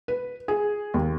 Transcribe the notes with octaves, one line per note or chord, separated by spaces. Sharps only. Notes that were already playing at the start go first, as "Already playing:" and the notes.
B4
G#4
D#2